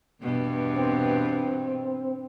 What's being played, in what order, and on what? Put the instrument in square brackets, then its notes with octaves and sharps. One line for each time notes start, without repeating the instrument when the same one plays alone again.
[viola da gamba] E2 G2 B2
[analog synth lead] C4